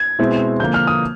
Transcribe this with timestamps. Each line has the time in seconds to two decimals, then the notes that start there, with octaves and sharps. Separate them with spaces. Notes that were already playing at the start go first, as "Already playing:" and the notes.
Already playing: G#6
0.19 B2 G#3 C4 E4
0.60 D3 F3 A#3 G6
0.74 F6
0.87 D#6